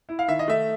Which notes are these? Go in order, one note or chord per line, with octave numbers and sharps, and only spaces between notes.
E4
F5
D#3 E5
D#5
A3 E5